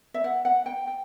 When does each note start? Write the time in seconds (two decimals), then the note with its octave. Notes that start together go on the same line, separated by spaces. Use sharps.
0.14 E5
0.24 F#5
0.45 F#5
0.66 G5
0.87 G5